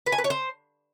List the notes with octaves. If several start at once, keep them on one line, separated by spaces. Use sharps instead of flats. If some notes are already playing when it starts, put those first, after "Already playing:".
B4
G#5
B4
C#5
C5